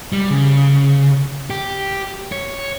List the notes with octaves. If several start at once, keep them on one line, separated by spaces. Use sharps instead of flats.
G3
C#3
G4
C#5